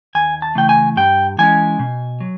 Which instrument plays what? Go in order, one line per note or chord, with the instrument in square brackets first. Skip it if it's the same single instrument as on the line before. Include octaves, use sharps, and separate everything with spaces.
[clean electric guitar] D#2 G#5
A5
C#3 E3 A3 G5
G#5
G2 G5
E3 G#3 C#4 G#5
B2
F#3